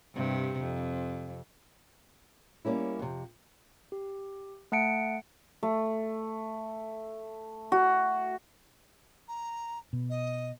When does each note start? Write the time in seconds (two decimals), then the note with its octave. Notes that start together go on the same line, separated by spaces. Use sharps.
0.14 G2 C3
0.61 F2
2.65 G3 A#3 C#4 E4
2.99 F2 C3
3.92 G4
4.72 A3 F#5 A5 C#7 D7
5.63 A3
7.72 F#4
9.28 A#5
9.93 B2
10.09 D#5